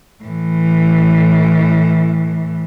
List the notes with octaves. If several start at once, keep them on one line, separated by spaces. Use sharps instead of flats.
A2 E3